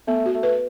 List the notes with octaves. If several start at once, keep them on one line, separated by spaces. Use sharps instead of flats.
A3 B3
F#4
A3
B4